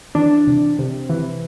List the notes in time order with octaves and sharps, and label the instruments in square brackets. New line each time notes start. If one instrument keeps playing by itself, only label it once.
[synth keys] E3 D4
C3
C3
E3